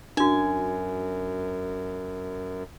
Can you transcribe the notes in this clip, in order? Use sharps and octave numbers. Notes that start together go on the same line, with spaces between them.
F#2 D4 F#4 G#5